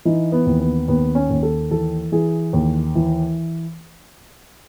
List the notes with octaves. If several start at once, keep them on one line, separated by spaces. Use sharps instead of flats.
E3 D#4
B3
D#2
B3
D#2 B3
C#4
D#2
A4
E3 A4
E3 G#4
D#2
E3